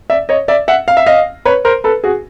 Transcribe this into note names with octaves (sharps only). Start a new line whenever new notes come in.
D5 E5
C#5 D#5
D5 E5
E5 F#5
F5
E5
D#5 F5
B4 C#5
A#4 C5
A4 B4
F#4 G#4